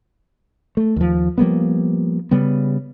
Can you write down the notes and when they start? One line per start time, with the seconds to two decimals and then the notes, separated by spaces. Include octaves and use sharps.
0.77 A3
0.96 D#2 F3
1.38 F3 G3 A#3 B3
2.31 C#3 G3 B3